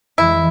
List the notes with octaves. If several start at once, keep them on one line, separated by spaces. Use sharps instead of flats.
F2 E3 G#3 E4